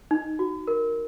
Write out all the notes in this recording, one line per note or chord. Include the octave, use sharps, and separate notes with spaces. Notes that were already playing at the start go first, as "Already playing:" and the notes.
D#4
F#4
A#4